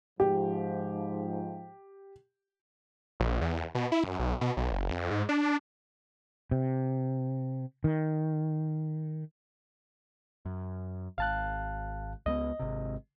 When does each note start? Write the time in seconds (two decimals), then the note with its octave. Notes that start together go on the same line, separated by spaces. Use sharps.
0.20 G#2 F3 G4
3.20 A#1
3.41 E2
3.75 B2
3.92 E4
4.04 F#2
4.19 B1
4.41 B2
4.57 B1
4.72 F#1
4.91 F2
5.11 G#2
5.29 D4
6.51 C3
7.84 D#3
10.45 F#2
11.18 G#1 F5 A5 F#6
12.26 C#2 G3 B3 D#5
12.59 G#1 C3